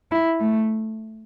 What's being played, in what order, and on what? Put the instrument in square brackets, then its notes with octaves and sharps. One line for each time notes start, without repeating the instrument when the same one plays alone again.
[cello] E4
A3